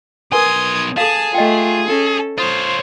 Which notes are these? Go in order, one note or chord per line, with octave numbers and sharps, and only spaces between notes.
B1 A#4 B4 G#5 C6 D#6 G#6
G#4 A4 F5 A5
A3 F4 D#5 G5
C#4 A4
F4 C5 C#5 D#6